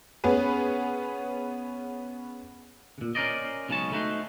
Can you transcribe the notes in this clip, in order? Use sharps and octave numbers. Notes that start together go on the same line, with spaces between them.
B3 C#4 G#4 B4
A#2 C#3
C#4 A#4 C5 D5 D#5
B1 C#3 G#3 C#5 A5
A3 D#4 F#4 C5